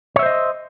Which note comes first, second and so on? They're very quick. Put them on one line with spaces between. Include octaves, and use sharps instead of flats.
C#5 E5 C5 D#5